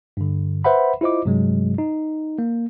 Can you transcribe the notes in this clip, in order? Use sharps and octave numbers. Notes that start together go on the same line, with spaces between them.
G2 D3
B4 C5 E5 F#5 B5
E4 F4 C5 D#5 D6
G2 C3 F#3 G#3
D#4
A#3